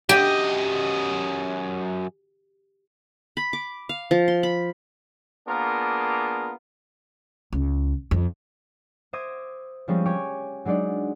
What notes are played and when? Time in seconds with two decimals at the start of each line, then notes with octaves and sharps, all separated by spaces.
0.09 F#2 G4 D#5
3.37 B5
3.53 D6
3.89 F5
4.11 F3
4.28 C6
4.43 B5
5.48 A#3 B3 D4 F4 G#4 A#4
7.53 C#2
8.11 F2
9.13 C5 E5 D6 D#6 G#6 A#6
9.88 F3 G3 G#3 C4 C#4
10.06 G4 C#5 G#5 D6
10.65 F#3 G#3 D4 D#4 D5